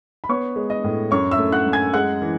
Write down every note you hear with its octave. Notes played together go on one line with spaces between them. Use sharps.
B5
B3 C#5 C#6
G#3
D#5 D#6
A2
F#2 C#5 C#6
E5 E6
A3
F#5 F#6
F#2
G#5 G#6
G#3 F#5 F#6
E3